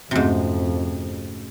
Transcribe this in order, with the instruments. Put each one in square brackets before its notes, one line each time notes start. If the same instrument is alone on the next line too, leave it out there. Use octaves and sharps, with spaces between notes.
[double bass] F2 [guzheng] G#2 C3 [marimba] A3 C#4 F#4